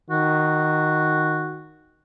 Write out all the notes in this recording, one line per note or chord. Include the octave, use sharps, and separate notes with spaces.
D#3 F#4